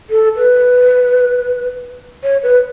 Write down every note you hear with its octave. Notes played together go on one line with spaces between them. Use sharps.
A4
B4
C#5
B4